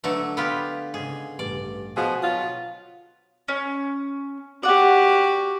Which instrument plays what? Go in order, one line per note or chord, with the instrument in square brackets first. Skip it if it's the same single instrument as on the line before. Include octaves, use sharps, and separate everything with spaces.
[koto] D3 F#3 A3 [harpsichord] B4 D#5 E5
[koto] B3 F4 G4
[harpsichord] G#2 C#3 [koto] G#4
[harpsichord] A1 G2 [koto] D5
[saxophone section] B2 F3 G#4 [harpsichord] F#4
[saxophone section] B2 F#3 F4 [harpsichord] D#6
[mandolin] C#4
[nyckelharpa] F#4 G4 [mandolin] D5 F#5